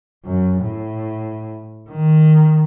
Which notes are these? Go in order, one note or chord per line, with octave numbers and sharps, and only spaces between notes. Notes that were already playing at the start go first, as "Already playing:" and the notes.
F#2
A2
D#3